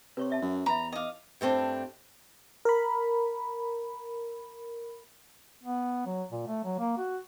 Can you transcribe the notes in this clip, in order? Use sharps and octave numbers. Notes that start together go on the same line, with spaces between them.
C3 B4 C#5 C#6
D5 E5 A5
F#2
E2 B4 E5 A#5 B5
D#4 D#5 F5 D6
G2 A3 C4 D4
A#4 B5
B3
F#3
A#2
A3
F#3
A#3
F#4